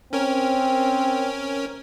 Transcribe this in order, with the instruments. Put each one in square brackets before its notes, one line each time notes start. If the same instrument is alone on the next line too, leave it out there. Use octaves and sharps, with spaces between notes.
[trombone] C4 [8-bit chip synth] C#4 A#4 C#5